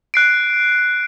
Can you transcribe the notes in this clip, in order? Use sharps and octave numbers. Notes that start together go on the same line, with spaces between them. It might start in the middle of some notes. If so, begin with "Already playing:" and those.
F#6 C7 D7